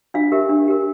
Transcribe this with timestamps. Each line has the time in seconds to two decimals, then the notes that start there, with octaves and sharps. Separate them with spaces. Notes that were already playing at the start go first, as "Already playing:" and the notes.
0.14 D4 F4 F5
0.32 G4 A#4 E5
0.49 D4
0.68 G4 A#4